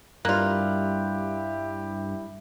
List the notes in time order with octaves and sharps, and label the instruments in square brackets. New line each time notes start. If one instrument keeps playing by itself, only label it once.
[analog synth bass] G2 [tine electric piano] G3 F#6 [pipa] A#3 F4 [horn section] E4 G4